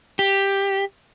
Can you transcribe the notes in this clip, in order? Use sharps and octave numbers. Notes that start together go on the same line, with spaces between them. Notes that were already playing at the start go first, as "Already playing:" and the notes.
G4